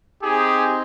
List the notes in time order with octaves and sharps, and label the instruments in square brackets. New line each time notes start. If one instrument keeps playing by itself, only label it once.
[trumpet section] C4 D#4 G4 G#4